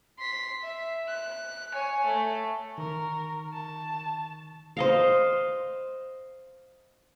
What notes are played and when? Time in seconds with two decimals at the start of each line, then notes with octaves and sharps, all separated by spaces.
0.19 C6 B6
0.63 E5
1.08 F#6
1.74 C#5 G#5
2.06 A3
2.78 D#3 A#4 C#6
3.53 A5
4.77 C5 D#5 F5